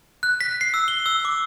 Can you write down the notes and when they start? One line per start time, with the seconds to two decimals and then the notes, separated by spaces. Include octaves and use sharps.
0.23 F#6
0.41 B6
0.61 C7
0.74 E6
0.88 G7
1.06 E6
1.25 D6